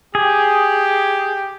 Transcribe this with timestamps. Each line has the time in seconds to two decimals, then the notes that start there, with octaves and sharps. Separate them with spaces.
0.15 G4 G#4